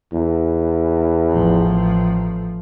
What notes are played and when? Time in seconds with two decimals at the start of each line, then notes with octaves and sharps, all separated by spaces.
0.13 E2
1.30 A1 F3